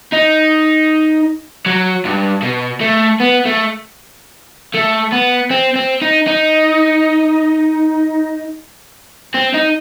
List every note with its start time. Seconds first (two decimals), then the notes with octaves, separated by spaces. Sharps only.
0.13 D#4
1.66 F#3
2.05 G2
2.42 B2
2.81 A3
3.20 B3
3.46 A3
4.74 A3
5.12 B3
5.51 C4
5.76 C4
6.02 D#4
6.28 D#4
9.34 C4
9.54 D#4